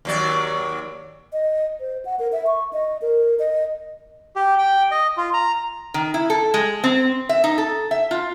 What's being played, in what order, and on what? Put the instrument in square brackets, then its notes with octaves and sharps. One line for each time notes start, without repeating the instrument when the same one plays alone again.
[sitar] D#2 F#3 D5
[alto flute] D#5
C5
F#5
A#4
E5
C#6
D#5
A#4
D#5
[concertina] G4
G5
D#5
F4
A#5
[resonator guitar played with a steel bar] D#3
E4
A4
G#3
C4
E5
D#4
A4
E5
F4